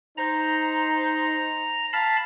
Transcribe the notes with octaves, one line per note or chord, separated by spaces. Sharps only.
D#4 C5 A#5
F5 A5 B5